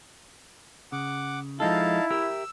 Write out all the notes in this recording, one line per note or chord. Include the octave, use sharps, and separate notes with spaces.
C#3 F#5 D6
F3 G#3 D#4 E4 A4 F5 A5
G4 A#4 E5 E6